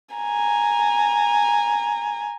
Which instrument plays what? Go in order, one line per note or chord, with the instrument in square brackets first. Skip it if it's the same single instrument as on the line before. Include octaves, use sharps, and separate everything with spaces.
[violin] G#5 A#5